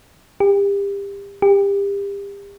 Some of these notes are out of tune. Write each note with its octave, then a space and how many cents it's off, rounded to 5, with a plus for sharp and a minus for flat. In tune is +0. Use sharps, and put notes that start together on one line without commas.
G4 +30
G4 +30